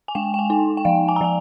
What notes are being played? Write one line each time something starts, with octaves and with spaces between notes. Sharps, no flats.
G#5
G#3 G5
G5
G#5
D#4
G5
F3 F5
G#5
A#5
F3 G#5